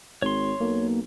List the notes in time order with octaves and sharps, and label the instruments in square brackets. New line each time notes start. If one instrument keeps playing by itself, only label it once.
[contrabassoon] G#1 [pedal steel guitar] C#5 C6
[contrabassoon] B1 [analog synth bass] A#3